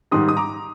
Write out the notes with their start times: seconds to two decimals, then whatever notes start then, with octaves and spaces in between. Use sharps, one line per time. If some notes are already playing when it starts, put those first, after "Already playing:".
0.11 G#2 D#3 G3 C6 D#6
0.29 D#6
0.37 A#5 D6